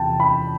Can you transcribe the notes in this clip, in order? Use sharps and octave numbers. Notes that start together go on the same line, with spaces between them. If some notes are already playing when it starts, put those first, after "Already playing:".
Already playing: E2 C3 F3 G5 A5
B5